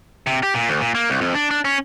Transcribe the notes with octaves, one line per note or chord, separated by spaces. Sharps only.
C3
G4
A#2
D2
A#2
A#3
C2
F2
D4
D4
C#4